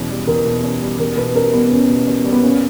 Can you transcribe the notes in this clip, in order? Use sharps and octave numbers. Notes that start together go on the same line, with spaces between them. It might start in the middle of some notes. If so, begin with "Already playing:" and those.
Already playing: E2 B2 C#4
G3
E2 A#4
B2
C#4
G3
E2 A#4
B2 B4
C#4 A#4
G3 B3
E2 C#4
B2
C#4
G3
B3
A#2 C#4